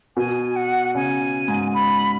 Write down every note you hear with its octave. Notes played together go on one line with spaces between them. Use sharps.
B2 G#5
F#5
C#3 G#5
G#2
B5